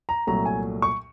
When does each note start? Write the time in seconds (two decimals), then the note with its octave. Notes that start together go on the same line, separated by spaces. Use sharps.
0.09 A#5
0.27 C2 A#2 F#3 A3 A#5
0.45 G#5
0.82 C#6